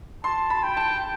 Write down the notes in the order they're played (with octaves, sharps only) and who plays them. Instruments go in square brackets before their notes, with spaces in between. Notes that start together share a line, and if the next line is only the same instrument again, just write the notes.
[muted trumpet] A5 [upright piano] C6
[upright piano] B5
[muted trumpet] G5
[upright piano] A5